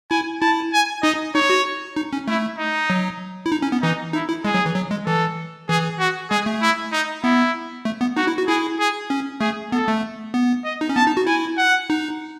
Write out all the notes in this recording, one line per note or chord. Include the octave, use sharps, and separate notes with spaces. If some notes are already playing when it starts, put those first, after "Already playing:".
E4 G#5
E4 A5
G#5
D#4 D#5
D#4 C#5
F#4
D#4
C#4
A3 E4
D#4
F#3
E4
D#4
C#4
B3
E3 D#4
D#4 E4
E4
G#3 G#4
F#3
E3
F#3
G#3
E3 A4
E3 G#4
F#4
G#3 G#4
A3
E4
D#4
B3 E4
A3
B3
D#4 F#4
E4
F#4
E4 G#4
G#4
C#4
A3 G#4
B3 A4
A3
B3
D#5
D#4
C#4
B3 A5
D#4
F#4
E4 G#5
F#5
D#4